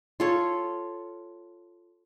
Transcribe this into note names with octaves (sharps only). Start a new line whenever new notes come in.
F4 A4 C#5